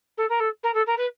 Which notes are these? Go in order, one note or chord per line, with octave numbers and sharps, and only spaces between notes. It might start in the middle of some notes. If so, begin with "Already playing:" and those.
A4
A#4
A4
A#4
A4
A#4
B4